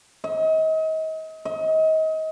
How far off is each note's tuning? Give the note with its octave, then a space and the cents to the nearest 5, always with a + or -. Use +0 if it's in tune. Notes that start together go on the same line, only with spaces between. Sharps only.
D#5 +35
D#5 +30